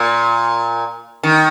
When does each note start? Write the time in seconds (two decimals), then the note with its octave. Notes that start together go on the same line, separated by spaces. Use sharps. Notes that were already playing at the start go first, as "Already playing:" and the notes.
Already playing: A#2
1.23 D#3